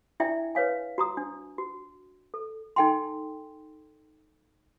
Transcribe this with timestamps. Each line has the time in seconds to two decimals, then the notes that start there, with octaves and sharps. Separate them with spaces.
0.20 D4 E4 D5 E5 G5 G#5
0.55 B4 C#5 F5 G#5
0.98 F#4 A#5 D#6
1.17 D4
1.58 F#4
2.34 A4
2.76 D#4 A4 G5 G#5 C6